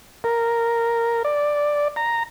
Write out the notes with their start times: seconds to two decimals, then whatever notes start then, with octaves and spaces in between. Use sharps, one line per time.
0.24 A#4
1.25 D5
1.96 A#5